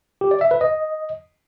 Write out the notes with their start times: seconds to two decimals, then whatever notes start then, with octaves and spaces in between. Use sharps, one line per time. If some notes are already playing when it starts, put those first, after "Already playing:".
0.21 G4
0.31 D5
0.41 E5
0.51 B4
0.61 D#5